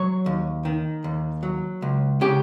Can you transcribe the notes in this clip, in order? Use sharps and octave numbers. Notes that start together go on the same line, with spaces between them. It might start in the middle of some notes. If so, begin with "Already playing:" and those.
Already playing: F#3 C#5
D#2
D#3
D#2
F#3
C#2
C#3 G4